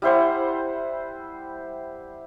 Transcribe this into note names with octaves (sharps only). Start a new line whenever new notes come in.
G3 E4 C5 F#5